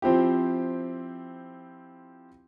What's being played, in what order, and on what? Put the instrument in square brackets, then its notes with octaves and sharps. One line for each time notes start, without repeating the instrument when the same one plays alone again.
[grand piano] F3 C4 E4 G4